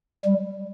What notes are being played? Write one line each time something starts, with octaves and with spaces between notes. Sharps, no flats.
G3